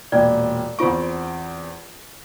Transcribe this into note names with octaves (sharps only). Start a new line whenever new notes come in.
E1 A#2 D5 G5
E2 C4 F4 C#6 D7